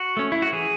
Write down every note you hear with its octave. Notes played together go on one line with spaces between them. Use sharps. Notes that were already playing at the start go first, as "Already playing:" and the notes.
Already playing: F#4
A3 C#4
E4
F#4
E3 G#4